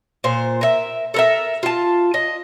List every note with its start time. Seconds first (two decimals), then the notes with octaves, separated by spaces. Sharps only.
0.24 A#2 C5
0.61 A#4 E5
1.14 A4 A#4 E5
1.63 F4 A5
2.14 D#5